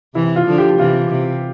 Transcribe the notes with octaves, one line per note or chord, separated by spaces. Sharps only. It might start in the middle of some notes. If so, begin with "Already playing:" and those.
C3 E3 E4
F4
D3 F3
G4
C3 E3 F4
C3